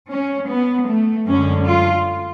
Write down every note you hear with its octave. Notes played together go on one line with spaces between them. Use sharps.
C#4
B3
A3
F#2 D3 G#3 C#4
F4